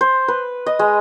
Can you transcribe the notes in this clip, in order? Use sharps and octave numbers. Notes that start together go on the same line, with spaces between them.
C5
B4
D#5
G#3